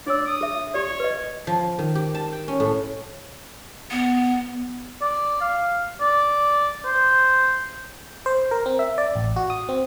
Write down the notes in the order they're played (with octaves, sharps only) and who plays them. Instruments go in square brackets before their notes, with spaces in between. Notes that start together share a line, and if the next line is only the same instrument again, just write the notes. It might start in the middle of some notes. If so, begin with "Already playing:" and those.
[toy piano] D4 C#5 E6 [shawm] D5
[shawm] D#6
[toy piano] G#4 E5
[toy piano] G4 D5 [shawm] C#5
[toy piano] B4 D#5
[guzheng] F3
D#3
G4
A5
G5
C#4
A2
[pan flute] B3
[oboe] D5
F5
D5
C5
[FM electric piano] C5
A#4
C4
E5
D5
A1
F#4
D#6
C4